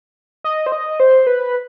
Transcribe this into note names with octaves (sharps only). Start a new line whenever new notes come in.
D#5
C5
D#5
C5
B4